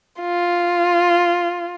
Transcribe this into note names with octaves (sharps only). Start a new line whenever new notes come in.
F4